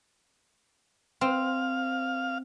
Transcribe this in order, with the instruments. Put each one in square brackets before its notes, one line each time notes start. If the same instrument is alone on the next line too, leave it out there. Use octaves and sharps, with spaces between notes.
[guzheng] C4 [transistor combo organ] F5